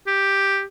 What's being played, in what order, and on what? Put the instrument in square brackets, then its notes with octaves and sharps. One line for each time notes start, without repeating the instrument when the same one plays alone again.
[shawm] G4